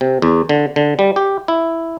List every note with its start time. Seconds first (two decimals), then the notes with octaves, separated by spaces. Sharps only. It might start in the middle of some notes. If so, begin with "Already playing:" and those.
0.01 C3
0.22 E2
0.49 D3
0.76 D3
0.99 G3
1.16 G4
1.48 E4